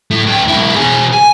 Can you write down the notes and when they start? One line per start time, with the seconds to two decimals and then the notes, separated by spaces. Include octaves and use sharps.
0.11 A2 A3
0.27 D2 G5
0.48 B1 E4
0.76 B2 G#4
1.13 G#5